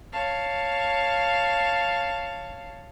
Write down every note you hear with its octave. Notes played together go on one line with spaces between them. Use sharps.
C#5 F5 A5